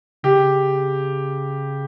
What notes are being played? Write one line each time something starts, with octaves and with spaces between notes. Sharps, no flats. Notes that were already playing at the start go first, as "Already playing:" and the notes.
C#3 G4